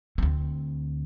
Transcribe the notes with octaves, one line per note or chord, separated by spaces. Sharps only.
D2 C4